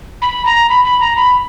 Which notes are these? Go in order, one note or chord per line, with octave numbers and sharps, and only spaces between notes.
B5
A#5
B5
B5
A#5
B5